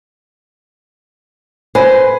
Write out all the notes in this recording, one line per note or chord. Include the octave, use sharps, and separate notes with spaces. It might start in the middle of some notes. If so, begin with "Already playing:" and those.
B4 C5 G#5